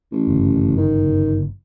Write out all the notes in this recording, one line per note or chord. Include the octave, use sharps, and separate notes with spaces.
A1
G1 F#2 C#3
D#3